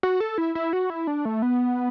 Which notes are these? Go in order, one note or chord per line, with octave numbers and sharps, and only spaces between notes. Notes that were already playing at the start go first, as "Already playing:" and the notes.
F#4
A4
E4
E4
F#4
E4
D4
A3
B3